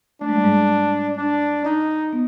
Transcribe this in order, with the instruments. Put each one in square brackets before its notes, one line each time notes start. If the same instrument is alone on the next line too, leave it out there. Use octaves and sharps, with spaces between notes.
[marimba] A3 [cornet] D4
[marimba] G#3
G3
G#2 G#3
[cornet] D4
D#4
[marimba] B3